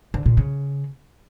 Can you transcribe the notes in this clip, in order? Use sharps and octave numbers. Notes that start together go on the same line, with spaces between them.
D3
A#2
C#3